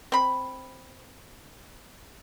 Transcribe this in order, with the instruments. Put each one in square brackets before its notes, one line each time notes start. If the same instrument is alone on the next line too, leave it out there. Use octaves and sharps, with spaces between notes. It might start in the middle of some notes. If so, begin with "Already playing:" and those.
[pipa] C4 B5